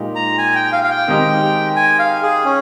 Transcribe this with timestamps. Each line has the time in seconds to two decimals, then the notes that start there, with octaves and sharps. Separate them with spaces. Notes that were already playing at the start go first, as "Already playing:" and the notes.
Already playing: A#2 G#3 D#4 G4
0.16 A#5
0.38 G#5
0.55 G5
0.72 F5
0.84 F5
0.91 G5
1.08 D#3 G#3 C4 D#4 G4
1.76 G#5
1.99 F5
2.23 G#4
2.45 C#4